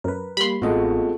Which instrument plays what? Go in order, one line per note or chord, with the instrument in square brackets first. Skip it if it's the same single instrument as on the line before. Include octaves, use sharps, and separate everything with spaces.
[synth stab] F#2 [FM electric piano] A#4 B4
[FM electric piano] G3 A#3 [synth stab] B5 C6
[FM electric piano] A1 D#5 [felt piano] G#3 A3 F#4 [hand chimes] B3 C4 F4